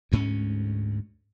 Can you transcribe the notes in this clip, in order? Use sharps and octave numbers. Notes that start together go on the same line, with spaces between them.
D2 G#2 A3 C#4